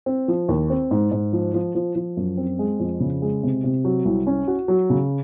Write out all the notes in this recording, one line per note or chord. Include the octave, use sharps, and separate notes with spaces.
C4
F3
D#2
C4
G#2
G#2
F3
F3
F3
F3
F#2
C4
G#3
F2
C#3
G#3
C3
C3
F#3
C2
C#4
F#4
F#3
C#3